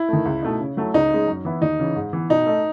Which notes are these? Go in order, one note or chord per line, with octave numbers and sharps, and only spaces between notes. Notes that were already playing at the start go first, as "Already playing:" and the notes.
Already playing: E4
D#3 A3
C#2
B2 A3 D#4
C#3
F#3 A3 E4
C#2 D#4
C#3 G#3
F#2
E3 B3 E4
D#2 D#4
C#3 E3
G#2
E3 B3
B2 D#4
A3 D#4